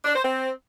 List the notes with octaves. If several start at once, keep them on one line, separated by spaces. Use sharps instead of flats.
D4
C5
C4